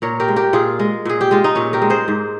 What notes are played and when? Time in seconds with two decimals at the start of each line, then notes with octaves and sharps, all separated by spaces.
0.02 A#2 A#4 C#5
0.20 G4 A#4
0.28 G#3
0.36 G4 A#4
0.53 A#2 F4 G#4
0.79 G#3
1.05 A#2 G#4
1.21 G4
1.31 G#3 F4
1.44 D#4
1.55 A#2 C#4
1.73 G4 A#4
1.82 G#3
1.90 G#4 C5
2.08 G#2